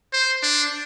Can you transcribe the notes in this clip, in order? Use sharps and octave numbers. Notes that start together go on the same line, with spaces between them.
C5
D4